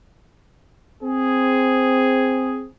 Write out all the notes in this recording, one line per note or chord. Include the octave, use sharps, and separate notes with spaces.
C4 G#4